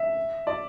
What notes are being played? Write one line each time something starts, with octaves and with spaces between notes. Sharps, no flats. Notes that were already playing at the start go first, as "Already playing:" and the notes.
Already playing: E5
D5